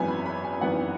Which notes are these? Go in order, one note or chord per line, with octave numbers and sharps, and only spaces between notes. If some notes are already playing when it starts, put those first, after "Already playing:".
Already playing: G#1 F#2 E3 B3 G#5
B5
B5
G#5
G#1 F#2 E3 B3 F#5